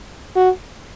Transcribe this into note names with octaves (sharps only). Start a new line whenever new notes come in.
F#4